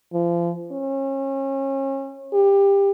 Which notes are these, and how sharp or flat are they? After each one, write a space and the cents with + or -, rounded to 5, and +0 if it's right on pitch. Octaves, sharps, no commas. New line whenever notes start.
F3 -30
C#4 -35
G4 +20